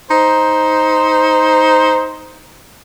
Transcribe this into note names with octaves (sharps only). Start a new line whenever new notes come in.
D#4 C5